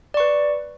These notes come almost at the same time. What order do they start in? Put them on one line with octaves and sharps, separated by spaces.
D5 C#6 B4